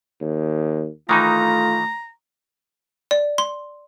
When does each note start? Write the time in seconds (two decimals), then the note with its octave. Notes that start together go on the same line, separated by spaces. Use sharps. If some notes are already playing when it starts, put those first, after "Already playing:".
0.21 D#2
1.09 D#3 E3 A3 D#4 F4 A#5
3.11 D5
3.38 C6